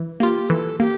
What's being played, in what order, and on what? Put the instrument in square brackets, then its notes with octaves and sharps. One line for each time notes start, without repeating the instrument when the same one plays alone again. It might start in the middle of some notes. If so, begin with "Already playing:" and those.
Already playing: [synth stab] E3
[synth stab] A#3 F4 [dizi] G4
[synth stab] E3 [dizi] A4
[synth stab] A#3 [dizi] G4